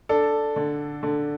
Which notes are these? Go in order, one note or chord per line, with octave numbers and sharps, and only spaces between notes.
D4 A4
D3
D3